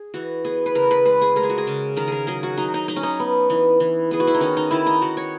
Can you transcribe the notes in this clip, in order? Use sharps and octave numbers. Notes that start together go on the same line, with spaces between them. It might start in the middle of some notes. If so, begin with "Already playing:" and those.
Already playing: G#4
E3 F#4
B3 G#4
B4
C#3 A#4
B4
G#3 B4
G#4
G#3 A#4
G#4
F#4
G#4
C#3
D#3 A#4
G#4 A#4
F#3 G#4
F#4
F#3 D#4
D#4
F#3 D#4
C#4
D#4
B3
E3
E3
B3 G#4
F#4
E4
D#4
D#3 C#4
D#4
D#3 E4
D#4
D#3 F#4
C#5